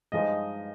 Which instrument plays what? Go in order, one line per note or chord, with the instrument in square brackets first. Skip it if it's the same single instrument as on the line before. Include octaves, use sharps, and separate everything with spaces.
[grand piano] G2 F3 G#3 D#4 [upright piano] D#5